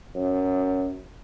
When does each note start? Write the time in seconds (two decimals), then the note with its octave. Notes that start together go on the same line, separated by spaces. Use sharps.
0.15 F#2